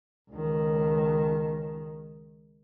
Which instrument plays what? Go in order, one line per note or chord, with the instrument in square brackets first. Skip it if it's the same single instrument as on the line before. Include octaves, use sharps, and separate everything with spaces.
[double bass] C#2 D#3